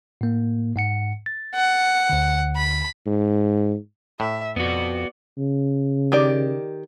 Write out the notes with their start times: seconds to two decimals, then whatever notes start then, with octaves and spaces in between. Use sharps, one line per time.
0.21 A2 A#3
0.76 G#2 F#5 C#7
1.26 A6
1.54 F#5
2.10 D2 D3
2.56 B5
3.06 G#2
4.20 A2 E5
4.56 F2 B3 F#4 D5
5.38 C#3
6.12 D#3 G4 D5